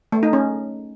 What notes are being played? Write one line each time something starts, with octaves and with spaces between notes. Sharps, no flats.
A3
D#4
C#4